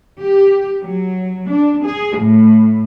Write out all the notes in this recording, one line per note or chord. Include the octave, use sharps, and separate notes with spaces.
G4
F#3
D4
G#4
A2